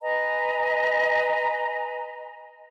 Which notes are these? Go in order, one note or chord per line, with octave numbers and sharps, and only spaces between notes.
B4 D#5 G#5 A#5